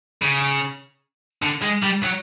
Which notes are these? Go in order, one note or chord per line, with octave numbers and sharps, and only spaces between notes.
C#3
D3
G#3
G3
F#3